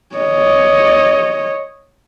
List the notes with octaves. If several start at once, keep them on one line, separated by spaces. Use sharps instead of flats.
C#5 D#5